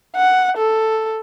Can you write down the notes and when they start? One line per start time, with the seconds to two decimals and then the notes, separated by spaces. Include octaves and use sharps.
0.16 F#5
0.57 A4